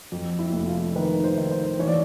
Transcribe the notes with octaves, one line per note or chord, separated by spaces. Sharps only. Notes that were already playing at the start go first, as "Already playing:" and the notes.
F2
E4
F1
F4
D#3 B4
C5
D#3
C5
E3 C#5
D5